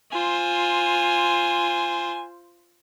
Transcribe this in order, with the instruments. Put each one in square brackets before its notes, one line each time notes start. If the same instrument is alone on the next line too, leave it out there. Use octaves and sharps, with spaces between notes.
[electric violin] F4 C5 [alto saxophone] G#5